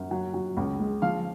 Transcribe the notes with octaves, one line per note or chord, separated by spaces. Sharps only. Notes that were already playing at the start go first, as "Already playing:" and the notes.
Already playing: F#2
F#3
F#3
C#2
G#3
F3 F5